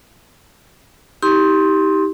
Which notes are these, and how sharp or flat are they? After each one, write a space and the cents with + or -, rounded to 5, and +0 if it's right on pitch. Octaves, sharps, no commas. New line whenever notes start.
D#4 +40 G4 +0 C6 +10